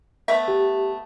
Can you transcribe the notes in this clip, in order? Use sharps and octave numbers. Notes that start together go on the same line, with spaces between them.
A3 B3 E5
G4